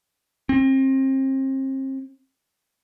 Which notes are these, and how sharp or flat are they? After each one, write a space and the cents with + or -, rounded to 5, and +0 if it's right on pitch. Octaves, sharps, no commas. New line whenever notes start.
C4 +35